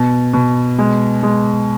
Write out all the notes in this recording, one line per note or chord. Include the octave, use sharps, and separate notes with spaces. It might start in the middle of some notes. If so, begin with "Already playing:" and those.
Already playing: B2
B2
G#3
G#3